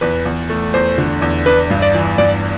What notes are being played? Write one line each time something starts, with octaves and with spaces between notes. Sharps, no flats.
E2 B4
E2
A3
E2 C5
D3
E2
D4 B4
G2
D5
E3
G2 D5